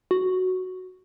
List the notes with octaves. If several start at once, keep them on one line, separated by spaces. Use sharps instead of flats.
F#4